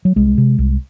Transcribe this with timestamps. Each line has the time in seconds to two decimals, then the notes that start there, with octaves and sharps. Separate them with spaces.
0.05 F#3
0.16 C2 G#3
0.38 C3
0.58 C2